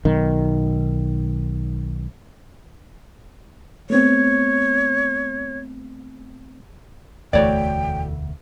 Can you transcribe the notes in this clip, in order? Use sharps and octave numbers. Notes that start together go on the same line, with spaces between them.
B1 D#3
A3 B3 C4 C#5
E1 D2 E3 A3 F#4 C#5 D5 G5